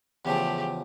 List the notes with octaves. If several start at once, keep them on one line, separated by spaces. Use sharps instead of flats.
E2 C#3 F3 A3 G4